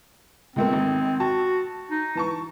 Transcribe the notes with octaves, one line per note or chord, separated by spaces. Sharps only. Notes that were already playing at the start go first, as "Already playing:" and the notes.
C#2 A3 A#3 C4
G#1
F#4 A5
D#4
E3 A5 C#6